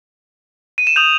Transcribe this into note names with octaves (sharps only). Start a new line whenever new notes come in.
D#7
E7
D#6 G6 F7